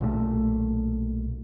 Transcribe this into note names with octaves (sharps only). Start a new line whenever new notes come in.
B1 A#2 G3 A3